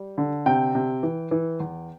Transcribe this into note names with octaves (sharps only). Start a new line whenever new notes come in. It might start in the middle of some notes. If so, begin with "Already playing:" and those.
Already playing: G3
D3
C3 G5
C3
E3
E3
E2